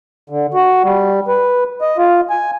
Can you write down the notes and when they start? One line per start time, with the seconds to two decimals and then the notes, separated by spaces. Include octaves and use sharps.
0.30 D3
0.54 F#4
0.84 G3
1.27 B4
1.81 D#5
1.98 F4
2.30 G#5